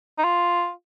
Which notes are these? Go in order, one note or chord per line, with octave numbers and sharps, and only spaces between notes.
D#4
F4